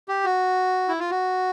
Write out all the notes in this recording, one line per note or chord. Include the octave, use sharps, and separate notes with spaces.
G4
F#4
E4
F4
F#4